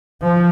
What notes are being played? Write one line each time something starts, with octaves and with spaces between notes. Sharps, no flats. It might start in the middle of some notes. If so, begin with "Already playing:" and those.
F3